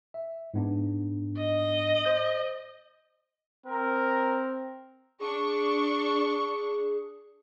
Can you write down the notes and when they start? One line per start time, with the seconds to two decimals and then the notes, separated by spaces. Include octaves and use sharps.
0.14 E5
0.54 G#2 B3 D4
1.37 D#5
2.05 C5 G6 A#6
3.66 C4 A#4
5.20 D4 G#4 C#6